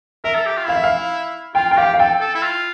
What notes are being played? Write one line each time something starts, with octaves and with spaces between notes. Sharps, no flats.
A#4 E5
A4
G4
F4
E4 F5
E5
F5
F4 G5
F4 G5
G4 F5
F5
A4 G5
A4
E4
F4